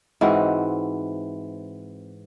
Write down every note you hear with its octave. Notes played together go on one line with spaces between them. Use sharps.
G#2 E3 C4 F#4